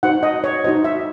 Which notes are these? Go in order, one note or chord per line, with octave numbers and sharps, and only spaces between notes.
D#4 F#4 C5 F#5
D#5
C#5
D#4 F#4 C5 D#5
E5